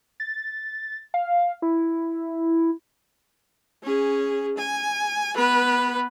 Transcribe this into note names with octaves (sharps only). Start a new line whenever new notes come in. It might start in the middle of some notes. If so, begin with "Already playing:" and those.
A6
F5
E4
C#4 G#4
G#5
B3 B4